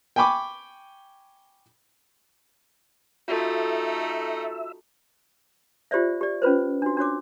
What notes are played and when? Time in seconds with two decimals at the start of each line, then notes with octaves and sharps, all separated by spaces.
0.16 G5 G#5 B5 C#6 D6
3.28 A3 D#4 F4 F#4 A4 E5
5.91 F4 G4 C5 D5 E5
6.21 G4 D5
6.42 C#4 F4 B4 C5
6.82 D4 F#4
6.97 D4 F#4 C#5 D6